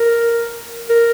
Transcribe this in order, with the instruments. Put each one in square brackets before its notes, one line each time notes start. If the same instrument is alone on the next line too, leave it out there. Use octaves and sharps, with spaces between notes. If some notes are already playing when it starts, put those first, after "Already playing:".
Already playing: [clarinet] A#4
A#4